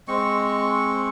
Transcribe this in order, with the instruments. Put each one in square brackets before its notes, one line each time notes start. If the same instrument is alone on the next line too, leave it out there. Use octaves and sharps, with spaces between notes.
[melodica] G#3 C4 C#6